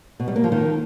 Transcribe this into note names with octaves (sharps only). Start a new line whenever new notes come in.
B2
G3
A#3
F3
D#3